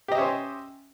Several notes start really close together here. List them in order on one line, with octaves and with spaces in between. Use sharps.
G4 D#5 E5 C#4 C5